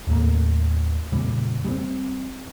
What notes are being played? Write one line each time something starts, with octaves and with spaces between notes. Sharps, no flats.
D#2 A2 A3 A#3
F2 A#2 C#3 G3
G3 G#3 C4